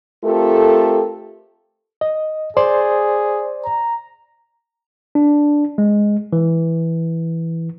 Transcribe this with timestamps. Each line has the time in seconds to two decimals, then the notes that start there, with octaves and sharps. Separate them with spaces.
0.24 A3 C4 F4 G4 A4 A#4
2.01 D#5
2.57 G#4 C5 D5 C6
3.65 A#5
5.15 D4
5.78 G#3
6.33 E3